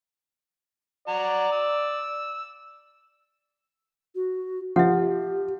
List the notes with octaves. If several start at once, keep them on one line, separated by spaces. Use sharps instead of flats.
F#4 D5 A#5
E6
F#4
F3 G4 E5 F#5